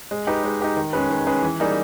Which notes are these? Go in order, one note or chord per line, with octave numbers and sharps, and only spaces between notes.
G#3
D#4 G4 B4
G#3
D#4 G4 B4
D#3
G#3 C#4 G#4 B4
D#3
G#3 C#4 G#4 B4
E3
G3 A#3 D#4 G#4